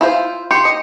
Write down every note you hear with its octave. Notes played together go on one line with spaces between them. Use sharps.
E4 F4 C5
G4 C6 C#7
D#5